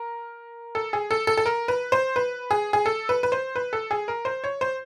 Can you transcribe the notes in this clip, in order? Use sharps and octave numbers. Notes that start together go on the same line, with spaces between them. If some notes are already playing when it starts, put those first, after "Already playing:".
Already playing: A#4
A4
G#4
A4
A4
A4
A#4
B4
C5
B4
G#4
G#4
A4
B4
B4
C5
B4
A4
G#4
A#4
C5
C#5
C5